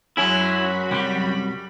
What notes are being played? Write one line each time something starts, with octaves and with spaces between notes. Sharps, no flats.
F#2 F#3 G#3 C#4 E4 F#4 B5
C2 G3